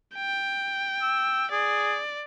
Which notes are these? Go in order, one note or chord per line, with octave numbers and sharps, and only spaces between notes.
G5
E6
G#4 D5